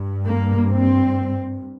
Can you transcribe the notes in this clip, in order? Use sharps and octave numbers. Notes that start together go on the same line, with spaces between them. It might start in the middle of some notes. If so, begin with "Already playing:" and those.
Already playing: G2
A#3
C4